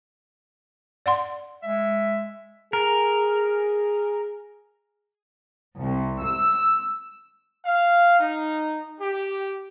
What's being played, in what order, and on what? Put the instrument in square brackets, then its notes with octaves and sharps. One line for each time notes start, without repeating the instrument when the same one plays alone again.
[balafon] D5 F#5 C6
[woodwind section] G#3 E5
[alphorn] G#4 [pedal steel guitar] A#4
[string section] C2
E6
[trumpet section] F5
D#4
G4